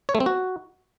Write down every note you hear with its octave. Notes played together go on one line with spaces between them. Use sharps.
C#5
A3
C4
F#4